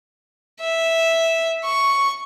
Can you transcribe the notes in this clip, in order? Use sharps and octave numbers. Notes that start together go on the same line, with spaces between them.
E5
C#6